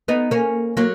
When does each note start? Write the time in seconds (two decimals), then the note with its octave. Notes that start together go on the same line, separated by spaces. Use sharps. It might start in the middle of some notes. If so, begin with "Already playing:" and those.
0.08 B3 D#4
0.31 A#3 C#4
0.77 F#3 A#3